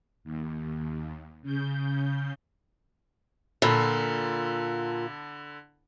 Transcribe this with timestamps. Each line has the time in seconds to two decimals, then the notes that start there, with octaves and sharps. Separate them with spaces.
0.24 D#2
1.42 C#3 G6
3.62 A#2 D3 A4 B5